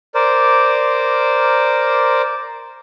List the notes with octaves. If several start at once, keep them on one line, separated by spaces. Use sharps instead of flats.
A#4 C5 D5